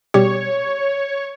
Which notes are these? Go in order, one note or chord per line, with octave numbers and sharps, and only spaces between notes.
B2 G3 G4 C#5